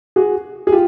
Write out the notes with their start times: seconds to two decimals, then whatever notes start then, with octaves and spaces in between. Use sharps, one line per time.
0.16 F#4 G#4
0.67 G#4
0.72 F4 G4